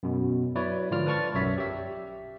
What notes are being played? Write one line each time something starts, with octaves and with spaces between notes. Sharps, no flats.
F#2 B2
F#3 E4 B4 C#5 D5
G#2 D3 F3 F4 D5 F6
B4 D5 A5 C#6 F6 A6
B1 F#2 C#5 E5 B6
G4 E5